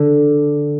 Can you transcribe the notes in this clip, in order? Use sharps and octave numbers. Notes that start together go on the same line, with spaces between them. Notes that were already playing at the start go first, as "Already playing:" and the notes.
Already playing: D3